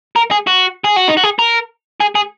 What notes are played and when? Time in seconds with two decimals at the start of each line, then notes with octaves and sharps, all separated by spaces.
0.16 A#4
0.31 G#4
0.47 F#4
0.84 G#4
0.96 F#4
1.08 D#4
1.17 F#4
1.23 G#4
1.39 A#4
2.00 G#4
2.15 G#4